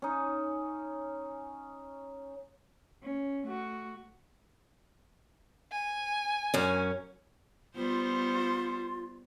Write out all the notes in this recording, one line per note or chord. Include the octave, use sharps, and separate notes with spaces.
C#4 D#4
C#4
A3 F#4
G#5
F#2 C#4
G3 B3 F4 C5